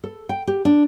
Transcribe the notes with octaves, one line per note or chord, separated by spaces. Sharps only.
A4
G5
G4
D4